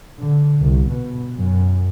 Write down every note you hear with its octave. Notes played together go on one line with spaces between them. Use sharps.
D3
C2
B2
F#2